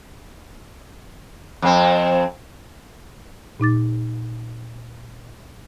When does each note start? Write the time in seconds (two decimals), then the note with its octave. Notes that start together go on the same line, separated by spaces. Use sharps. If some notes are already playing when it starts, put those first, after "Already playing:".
1.62 F2 C4
3.60 A#2 D#4 D6 A6